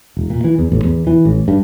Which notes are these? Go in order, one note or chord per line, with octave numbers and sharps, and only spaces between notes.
E1
A#2
E3
E2
A1
E2
E3
A1
G2